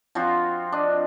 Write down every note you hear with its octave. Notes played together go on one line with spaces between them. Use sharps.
F3 C4 F4 F#4
D4 D#5